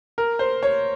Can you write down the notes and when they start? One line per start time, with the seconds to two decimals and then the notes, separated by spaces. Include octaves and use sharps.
0.18 A#4
0.39 C5
0.63 C#5